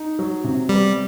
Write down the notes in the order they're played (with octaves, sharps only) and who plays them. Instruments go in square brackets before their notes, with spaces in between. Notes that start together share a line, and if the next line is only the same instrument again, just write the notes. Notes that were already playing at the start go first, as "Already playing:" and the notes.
Already playing: [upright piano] D#4
F#3
C3
[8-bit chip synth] G3 [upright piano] B3